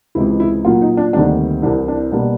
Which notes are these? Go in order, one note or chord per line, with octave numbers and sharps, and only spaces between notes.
C#2 C3 E3 G#3 E4
E4
A#2 F#3 A#3 F4
D#4
D4
D2 C3 D#3 G3 A#3 D4
C2 C3 E3 D4
D4
B2 G3 A#3 D4